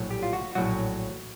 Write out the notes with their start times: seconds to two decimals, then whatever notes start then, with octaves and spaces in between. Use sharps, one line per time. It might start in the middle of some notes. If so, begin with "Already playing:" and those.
Already playing: A#1 A2 F#3
0.11 G4
0.23 F4
0.33 F#4
0.55 A#1 A2 F#3 F#4